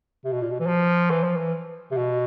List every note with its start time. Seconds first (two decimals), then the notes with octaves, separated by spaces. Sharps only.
0.25 C3
0.33 B2
0.42 A#2
0.51 B2
0.60 E3
0.67 F3
1.11 E3
1.23 F3
1.37 E3
1.91 C3
1.97 B2